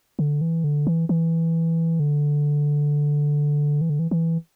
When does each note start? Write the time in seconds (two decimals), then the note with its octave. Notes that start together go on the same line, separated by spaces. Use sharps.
0.19 D3
0.41 E3
0.64 D3
0.87 E3
1.09 E3
2.00 D3
3.81 E3
3.90 D3
3.99 E3
4.11 E3